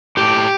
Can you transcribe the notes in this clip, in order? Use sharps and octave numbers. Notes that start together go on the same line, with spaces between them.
A2 G4